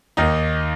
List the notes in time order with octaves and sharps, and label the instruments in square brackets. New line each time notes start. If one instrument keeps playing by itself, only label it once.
[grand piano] D#2 D#3 A#3 D#4